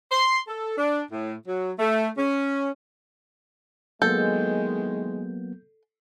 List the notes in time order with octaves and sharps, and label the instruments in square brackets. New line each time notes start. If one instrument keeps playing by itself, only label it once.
[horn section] C6
A4
D4
A2
F#3
A3
C#4
[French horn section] D#3 E3 G#3 [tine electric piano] F#3 A#3 B3 [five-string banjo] A4 [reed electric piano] G6